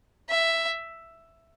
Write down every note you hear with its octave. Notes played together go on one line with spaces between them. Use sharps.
E5